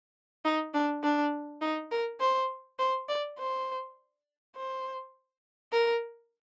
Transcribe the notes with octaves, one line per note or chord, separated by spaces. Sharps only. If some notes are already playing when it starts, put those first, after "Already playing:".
D#4
D4
D4
D#4
A#4
C5
C5
D5
C5
C5
A#4